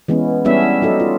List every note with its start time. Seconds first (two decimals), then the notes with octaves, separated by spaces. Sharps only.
0.08 E3 G#3 B3 C#4
0.45 G3 B3 C#4 D4 E4 E5
0.82 F#3 D#4 A4
1.00 F4